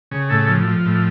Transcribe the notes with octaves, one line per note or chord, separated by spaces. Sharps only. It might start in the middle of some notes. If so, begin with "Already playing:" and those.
C#3
A2 A4
F3
F3
A2